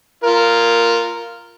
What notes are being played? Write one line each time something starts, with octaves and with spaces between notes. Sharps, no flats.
F4 A#4